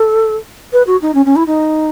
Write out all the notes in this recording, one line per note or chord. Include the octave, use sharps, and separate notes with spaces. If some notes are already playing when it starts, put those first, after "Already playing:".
Already playing: A4
B4
F#4
D#4
C#4
C#4
E4
D#4